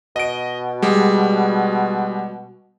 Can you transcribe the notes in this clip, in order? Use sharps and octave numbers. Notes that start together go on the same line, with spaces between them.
B2 D#5 D7
G3 G#3